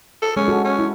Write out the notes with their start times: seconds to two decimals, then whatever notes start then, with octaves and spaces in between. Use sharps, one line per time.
0.22 A4
0.36 G#3 C#4
0.48 F#4 A4
0.65 C#4
0.79 E4